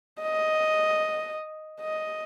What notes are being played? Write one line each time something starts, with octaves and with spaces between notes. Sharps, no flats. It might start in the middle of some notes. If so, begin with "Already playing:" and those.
D#5
D#5